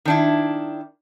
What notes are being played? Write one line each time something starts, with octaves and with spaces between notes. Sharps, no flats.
D#3 D4 E4